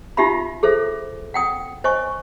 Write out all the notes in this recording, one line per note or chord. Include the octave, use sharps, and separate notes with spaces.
D#4 F4 G4 E5 F5 B5
G#4 A4 C5 E5
F#5 G5 D#6
C5 D#5 G#5 C#6